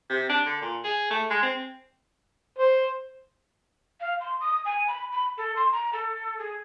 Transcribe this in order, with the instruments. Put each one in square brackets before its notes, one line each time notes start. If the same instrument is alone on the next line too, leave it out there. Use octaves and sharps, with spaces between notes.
[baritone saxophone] C3
D4
D3
A#2
G#4
A3
G#3
C4
[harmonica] C5
[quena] F5
C6
D#6
G#5
B5
B5
A4
C6
A#5
A4
G#4